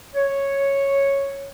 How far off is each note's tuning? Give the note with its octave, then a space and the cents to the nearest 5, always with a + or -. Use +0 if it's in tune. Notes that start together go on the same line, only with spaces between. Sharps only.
C#5 -5